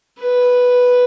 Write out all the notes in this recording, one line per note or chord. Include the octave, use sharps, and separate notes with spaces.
B4